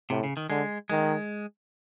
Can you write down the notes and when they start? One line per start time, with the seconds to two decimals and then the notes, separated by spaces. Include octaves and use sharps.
0.10 A2 C3
0.24 C#3
0.37 D#3
0.50 D3 G#3
0.90 D#3 G#3